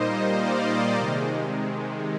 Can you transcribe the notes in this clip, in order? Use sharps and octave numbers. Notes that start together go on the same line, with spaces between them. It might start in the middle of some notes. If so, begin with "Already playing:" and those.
Already playing: A#2 G3 A#3 D#4 C5 D#5
D5 F5
C3 D#3 G#3